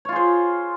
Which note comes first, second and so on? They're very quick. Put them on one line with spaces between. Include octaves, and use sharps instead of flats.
C#5 F4 G#4 C5